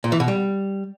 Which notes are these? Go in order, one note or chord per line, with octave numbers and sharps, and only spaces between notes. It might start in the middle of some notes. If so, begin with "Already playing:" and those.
A#2
E3
B2
G3